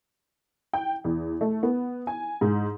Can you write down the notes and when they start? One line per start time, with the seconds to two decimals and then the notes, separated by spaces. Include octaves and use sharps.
0.73 G5
1.04 E2
1.41 A3
1.63 B3
2.07 G#5
2.41 G#2